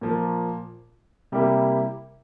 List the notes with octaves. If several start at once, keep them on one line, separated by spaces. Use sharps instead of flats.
A#2 F3 A#3
C3 G3 A#3 E4 G4